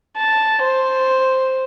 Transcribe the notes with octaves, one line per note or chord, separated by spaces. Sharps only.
A5
C5